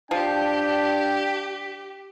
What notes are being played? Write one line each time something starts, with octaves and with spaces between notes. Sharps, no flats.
F3 D4 G4 G5